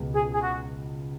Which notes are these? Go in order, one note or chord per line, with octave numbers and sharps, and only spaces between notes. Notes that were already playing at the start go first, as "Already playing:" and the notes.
Already playing: C#2 B2 G#3 B3
G#4
G#4
F#4